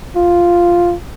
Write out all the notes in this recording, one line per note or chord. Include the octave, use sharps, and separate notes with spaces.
F4